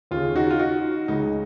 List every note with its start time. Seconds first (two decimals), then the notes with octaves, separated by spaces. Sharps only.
0.11 D#2 C#3 F4
0.36 D#4 F#4
0.51 F4
0.59 D#4 F#4
1.08 C#2 C#3 D#4